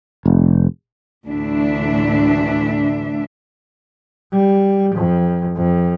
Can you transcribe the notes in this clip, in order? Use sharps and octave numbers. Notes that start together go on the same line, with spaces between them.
F1
D2 A2 E3 D4 E5
G3
F2
F2